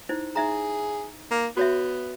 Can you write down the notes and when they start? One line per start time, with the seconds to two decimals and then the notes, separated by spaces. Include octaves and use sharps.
0.09 D#4 E4 C5
0.36 D#4 G#4 E5 A#5
1.31 A#3
1.57 B3 F#4 C#5 E5